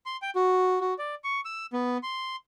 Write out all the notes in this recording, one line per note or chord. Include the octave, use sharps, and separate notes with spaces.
C6
G5
F#4
F#4
D5
C#6
E6
B3
C6